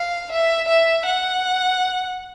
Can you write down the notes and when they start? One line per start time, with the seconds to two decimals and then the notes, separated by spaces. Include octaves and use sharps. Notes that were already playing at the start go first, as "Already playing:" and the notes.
Already playing: F5
0.32 E5
0.68 E5
1.05 F#5